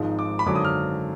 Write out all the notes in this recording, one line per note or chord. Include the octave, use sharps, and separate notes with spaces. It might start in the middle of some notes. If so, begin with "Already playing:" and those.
Already playing: G#1 G#2 F3 G#3 D#4
D6
B5
G#1 F#2 D3 F#3 D6
D#6
F6